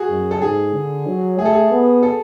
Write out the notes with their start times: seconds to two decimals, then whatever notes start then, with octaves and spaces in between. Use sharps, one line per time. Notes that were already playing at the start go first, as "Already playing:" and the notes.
Already playing: F#4 G#4
0.09 F#2
0.31 A4
0.41 G#2 G#4
0.74 D3
1.06 F#3
1.38 A3 G#4
1.45 A4
1.53 G#4
1.71 B3
2.03 A4